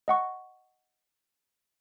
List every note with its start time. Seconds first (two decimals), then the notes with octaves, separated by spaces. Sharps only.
0.08 D#5 F#5 C#6